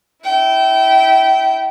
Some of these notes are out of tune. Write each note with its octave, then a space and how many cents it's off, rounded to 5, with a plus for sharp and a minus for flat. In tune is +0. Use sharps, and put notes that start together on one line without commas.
E4 -15 G5 -25